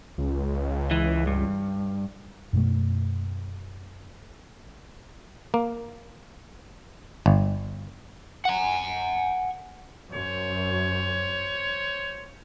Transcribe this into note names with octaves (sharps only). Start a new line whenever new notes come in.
C#2
E3
G2
F#2 B2 A3
A#3
G1
F#5 G#5
F#2 C5 C#5